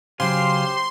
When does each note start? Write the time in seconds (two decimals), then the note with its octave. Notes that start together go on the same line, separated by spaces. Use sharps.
0.20 C#3 F#3 G4 C5 F5 G#5 C6